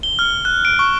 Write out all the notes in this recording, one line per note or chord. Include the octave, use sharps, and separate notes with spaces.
G7
F6
F#6
D7
C#6